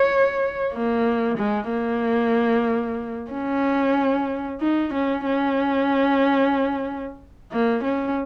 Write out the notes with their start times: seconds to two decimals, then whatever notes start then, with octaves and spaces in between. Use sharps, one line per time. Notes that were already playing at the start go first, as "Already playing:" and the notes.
Already playing: C#5
0.73 A#3
1.38 G#3
1.70 A#3
3.31 C#4
4.61 D#4
4.94 C#4
5.26 C#4
7.52 A#3
7.83 C#4